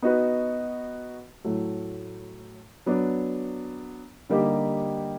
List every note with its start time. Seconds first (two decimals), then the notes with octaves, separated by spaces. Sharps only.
0.02 B3 D#4 F#4 B4
1.44 A2 F#3 A3
2.86 F#3 B3 D4
4.29 D3 G3 A#3 D#4 G4